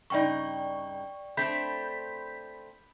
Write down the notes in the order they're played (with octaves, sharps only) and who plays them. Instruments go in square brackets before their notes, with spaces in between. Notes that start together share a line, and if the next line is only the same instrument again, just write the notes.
[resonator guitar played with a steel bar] G2 C#3 D#4 [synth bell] D5 G5 C#6
[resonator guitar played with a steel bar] A3 C4 D4 [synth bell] B5 G6 B6